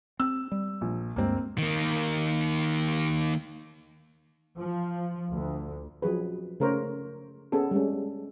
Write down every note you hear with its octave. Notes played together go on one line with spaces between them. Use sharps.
C4 E6
G3
A#1
D2 G2 G#3 A#3 C4
D#3 A#3
F3
D2
F3 F#3 G#4 B4
C#3 A3 A#4 C5 C#5
B3 C#4 G#4 A4
G3 G#3 C#4